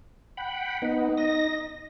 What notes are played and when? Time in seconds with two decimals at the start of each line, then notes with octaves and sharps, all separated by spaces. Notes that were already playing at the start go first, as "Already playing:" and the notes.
0.37 F#5 G5 B5
0.82 B3 D#4
1.18 D#5 A#6